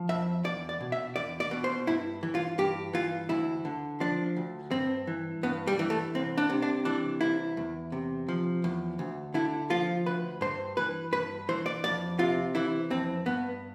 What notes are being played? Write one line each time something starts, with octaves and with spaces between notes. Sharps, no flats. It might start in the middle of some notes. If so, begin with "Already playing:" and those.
Already playing: F3
F2 E5
E2 D5
D5
B2
E5
E2 D5
D5
B2
C5
G2 E4
E3
F4
G2 G4
E3 F4
D2 E4
D3
F3 D4
D2
G2 C4
E3
G2 B3
G3
E3
A3
C2 C4
D4
C3
D4
E3 D4
C2 E4
E2
C3
F3
E2
D2
D3 E4
F3 F4
D2 B4
G2 C5
E3 B4
G2 B4
E3 C5
D5
F2 D5
C3 F4
E3 E4
F2 C4
G2 B3